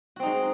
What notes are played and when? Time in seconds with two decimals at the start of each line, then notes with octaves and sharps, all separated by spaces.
0.16 F#4
0.19 C4
0.23 D#4
0.26 G#3